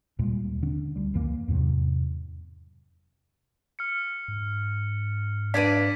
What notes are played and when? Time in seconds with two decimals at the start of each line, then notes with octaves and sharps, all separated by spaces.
0.19 D#2 A#2 G3 G#3
0.62 D3 C#4 D4
0.96 D2 G3
1.14 C#2 F#2 E3 A#3
1.48 E2 G#2 C3 F#3
3.79 F6 C#7
4.28 G#2
5.54 D4 B4 D5 F5 G#6 B6 D7 D#7